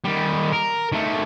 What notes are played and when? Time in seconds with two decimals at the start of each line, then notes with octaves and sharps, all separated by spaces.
0.04 D#3 G3
0.52 A#4
0.92 D#3 A3